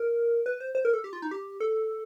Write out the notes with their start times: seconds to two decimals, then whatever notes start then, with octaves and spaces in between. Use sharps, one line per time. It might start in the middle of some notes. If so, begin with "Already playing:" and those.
Already playing: A#4
0.46 B4
0.60 C5
0.75 C5
0.85 A#4
0.93 A4
1.04 G4
1.13 F4
1.22 D#4
1.31 G4
1.60 A4